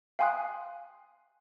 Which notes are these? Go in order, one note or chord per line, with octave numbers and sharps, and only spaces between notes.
F5 G5 G#5 C6 D#6 F#6